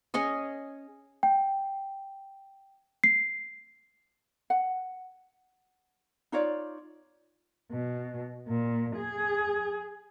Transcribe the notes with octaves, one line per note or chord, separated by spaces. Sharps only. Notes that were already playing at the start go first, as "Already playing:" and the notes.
C#4 G#4 C#5 D#5
G5
C7
F#5
D#4 F4 C#5 D5
B2
A#2
G#4